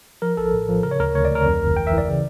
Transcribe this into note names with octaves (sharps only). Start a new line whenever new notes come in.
F3 A#4
A#1 A4
A2
F3
C#3 A#4
C#5
D2 A#4
D2 C#5
D5
D2
A#4
F2
G1
E3 G5
E5
E3
D5
C#3